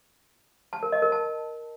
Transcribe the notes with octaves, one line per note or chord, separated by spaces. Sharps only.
A5
A#4
D#5
A#4
A5